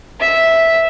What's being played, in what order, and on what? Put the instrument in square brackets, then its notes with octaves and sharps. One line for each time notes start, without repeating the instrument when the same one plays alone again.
[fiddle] E5